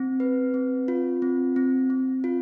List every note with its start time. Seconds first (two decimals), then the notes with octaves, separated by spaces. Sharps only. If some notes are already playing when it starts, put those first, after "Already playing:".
Already playing: C4
0.20 B4
0.54 C4
0.88 F4
1.22 C4
1.56 C4
1.90 C4
2.24 F4